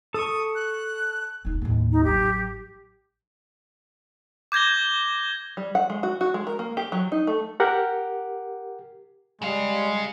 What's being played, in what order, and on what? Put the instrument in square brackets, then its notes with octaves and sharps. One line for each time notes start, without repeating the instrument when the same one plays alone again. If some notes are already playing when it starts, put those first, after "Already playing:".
[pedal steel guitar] A4 C#6 [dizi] D#6
[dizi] F#6
[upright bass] E1 D#4
D#2 A2
[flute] D#4
[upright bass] A1 F#3 [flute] G4
[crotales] D6 G6 G#6 A#6 G7
[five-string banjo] G3
F#5
G#3
F#4
F#4
G#3
A#4
A#3
G4
F#3
D#4
A3
[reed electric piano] G4 A#4 F#5
[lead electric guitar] C#3 F5 [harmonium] G3 [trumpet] G#3